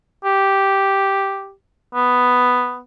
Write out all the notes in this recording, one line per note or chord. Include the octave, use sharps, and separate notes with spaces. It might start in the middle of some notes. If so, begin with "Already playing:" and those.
G4
B3